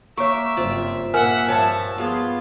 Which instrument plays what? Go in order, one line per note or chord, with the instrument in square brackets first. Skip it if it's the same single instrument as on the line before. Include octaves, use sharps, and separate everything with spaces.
[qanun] A#3 [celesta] C#5 C#6 [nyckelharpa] E5
[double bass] F#1 G2 [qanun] C4 F4
[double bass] A#2 A#3 [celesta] A#4 G#5 F6 [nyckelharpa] E5 F#5
[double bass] G2 F3 [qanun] C#5 E5 [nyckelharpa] A5
[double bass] B3 [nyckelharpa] F4 [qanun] G#4 F5